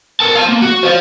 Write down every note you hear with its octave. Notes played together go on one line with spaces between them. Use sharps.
A#4 A5
F5 A5
A#3
F#4
C5 F5